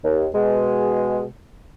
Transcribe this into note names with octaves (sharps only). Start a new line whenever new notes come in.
D#2
B2 G#3